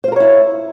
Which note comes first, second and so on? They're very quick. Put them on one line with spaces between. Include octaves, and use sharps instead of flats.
C5 F4 A#4 C#5 E4